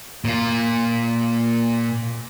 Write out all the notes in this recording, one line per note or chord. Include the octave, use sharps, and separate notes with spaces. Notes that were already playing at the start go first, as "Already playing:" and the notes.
A#2 F4